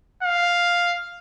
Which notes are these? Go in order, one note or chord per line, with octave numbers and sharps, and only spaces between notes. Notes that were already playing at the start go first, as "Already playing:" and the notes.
F5